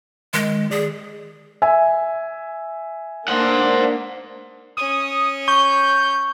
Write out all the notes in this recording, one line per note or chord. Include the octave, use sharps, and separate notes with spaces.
D#3 G#3
G#4 D5
E5 G#5
A#3 D4 C5 F#5
C#4 C#5 D#6
C#6 G6